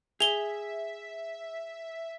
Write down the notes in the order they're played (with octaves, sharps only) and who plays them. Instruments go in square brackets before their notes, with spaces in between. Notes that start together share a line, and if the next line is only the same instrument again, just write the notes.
[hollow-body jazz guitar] G#4 [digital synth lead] E5 [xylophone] F7 G7